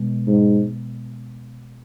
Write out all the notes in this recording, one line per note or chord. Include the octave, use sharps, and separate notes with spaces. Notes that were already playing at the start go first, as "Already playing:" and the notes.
Already playing: B2 G#3
G#2